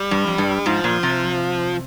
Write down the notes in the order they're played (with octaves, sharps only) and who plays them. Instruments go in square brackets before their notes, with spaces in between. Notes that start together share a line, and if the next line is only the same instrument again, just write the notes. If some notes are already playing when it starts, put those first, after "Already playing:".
Already playing: [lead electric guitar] G3
[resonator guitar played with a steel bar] G2
F2
G2
[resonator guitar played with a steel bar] G#2 [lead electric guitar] F3
[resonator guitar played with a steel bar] A#2
C3